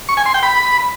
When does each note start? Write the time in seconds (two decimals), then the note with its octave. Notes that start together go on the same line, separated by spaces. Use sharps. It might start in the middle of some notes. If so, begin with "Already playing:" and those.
0.09 C#6
0.17 G#5
0.26 C6
0.34 G5
0.43 B5